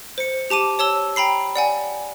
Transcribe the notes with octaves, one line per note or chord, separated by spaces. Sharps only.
C5 C#7
G4 A5 D6 D#7
C#5 A5 E6 G7
G5 A#5 B5 C7
D5 F#5 G#5